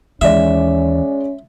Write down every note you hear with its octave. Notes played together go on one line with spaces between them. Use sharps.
D#2 E3 G#3 C#4 D5 E5